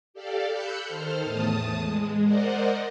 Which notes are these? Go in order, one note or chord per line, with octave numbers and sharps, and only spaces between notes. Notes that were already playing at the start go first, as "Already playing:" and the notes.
G4 A4 D5 F5
B5 E6 F#6 G6 C#7
D#3 A4 C5 F6
E2 A2 A5 D#6
G#3
A#4 C5 D5 D#5 F#5